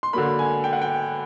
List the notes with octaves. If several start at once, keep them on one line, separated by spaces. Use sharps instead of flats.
C6
D3 F#3 A#3 B5
G#5
G5
F#5
G5